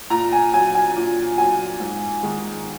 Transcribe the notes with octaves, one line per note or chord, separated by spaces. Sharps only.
A#2 A#5
G#5
F#3 G#5
G#5
A#2
F#3 G#5
G#2
D#3 G#3